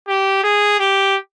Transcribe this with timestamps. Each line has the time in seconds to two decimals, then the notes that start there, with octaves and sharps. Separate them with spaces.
0.08 G4
0.43 G#4
0.79 G4